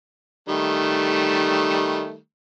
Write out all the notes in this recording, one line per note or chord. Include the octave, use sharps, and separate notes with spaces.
D#3 G3 A3